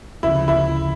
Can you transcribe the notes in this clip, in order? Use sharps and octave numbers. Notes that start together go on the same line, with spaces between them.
D2 C#3 F3 E4
E4